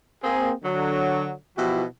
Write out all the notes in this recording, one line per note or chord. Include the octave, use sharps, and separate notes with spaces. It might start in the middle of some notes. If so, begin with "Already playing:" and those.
A#3 C4 G#4
D3 F#3
B2 E3 F3 E4 F#4 G4